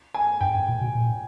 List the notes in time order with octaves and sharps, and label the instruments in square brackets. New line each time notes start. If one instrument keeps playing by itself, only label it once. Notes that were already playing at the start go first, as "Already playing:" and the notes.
[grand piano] G#5
[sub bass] G2 [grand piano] G5
[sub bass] G2
A#2
B2
A#2